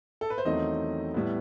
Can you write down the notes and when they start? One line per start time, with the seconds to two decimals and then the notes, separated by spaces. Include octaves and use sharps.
0.21 A4
0.30 B4
0.38 C5
0.45 E2 D#3 F#3 A3 C4 D#5
1.14 A2 G3 B3